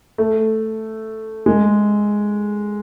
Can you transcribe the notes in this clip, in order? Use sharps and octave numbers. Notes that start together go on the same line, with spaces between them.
A3
G#3